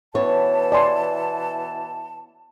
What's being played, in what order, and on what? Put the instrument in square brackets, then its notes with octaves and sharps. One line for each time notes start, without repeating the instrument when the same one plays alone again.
[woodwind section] B2 E3 A5 [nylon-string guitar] B3 C#5
[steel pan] D5 G#5 C6